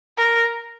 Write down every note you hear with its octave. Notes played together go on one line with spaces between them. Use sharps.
A#4